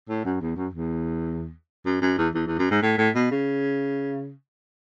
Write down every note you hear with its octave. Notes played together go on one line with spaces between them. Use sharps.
A2
F#2
E2
F#2
E2
F#2
F#2
E2
E2
E2
F#2
G#2
A2
A2
B2
C#3